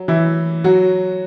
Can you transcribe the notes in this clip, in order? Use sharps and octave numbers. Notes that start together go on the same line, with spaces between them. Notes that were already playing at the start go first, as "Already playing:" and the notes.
Already playing: F#3
E3 E4
F#3 F#4